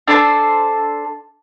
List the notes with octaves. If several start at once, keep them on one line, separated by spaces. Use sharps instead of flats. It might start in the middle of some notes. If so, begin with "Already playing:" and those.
D4 A4 C5 A5